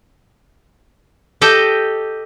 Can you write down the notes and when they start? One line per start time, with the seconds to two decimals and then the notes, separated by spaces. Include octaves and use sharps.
1.41 G4 A4 D#5 G5